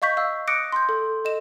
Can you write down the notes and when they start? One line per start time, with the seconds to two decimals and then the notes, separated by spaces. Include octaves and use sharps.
0.02 D#5 F5 C#6 G6 B6
0.17 F5 E6
0.48 D6 D#6 F#6 A#6 C#7 D7
0.72 C6 G6
0.89 A4
1.25 A4 D#5 E7